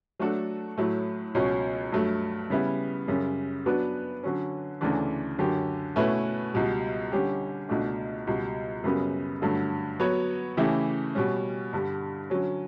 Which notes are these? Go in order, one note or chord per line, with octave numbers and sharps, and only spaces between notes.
F#3 A3 D4 F#4 A4
A2 F#3 A3
C#2 B2 F#3 C#4
G2 F#3 A3
C#3 G3 B3 E4
F#2 C#3 G3
F#3 B3 D4 F#4 B4
D3 F#3 C#4
D2 C#3 E3 A3 D4
F#2 D3 F#3 C#4 G4
B2 A3 C#4 E4 B4
C#2 B2 G3
D3 G3 C#4 G4
C#2 B2 A3 D4
C#2 B2 G3
F#2 C#3 G3 B3 F#4
G2 D3 F#3 A3
F#3 B3 F#4 C#5
C#3 E3 A3 E4 G4
B2 G3 C#4
G2 D3 G3
D3 F#3 C#4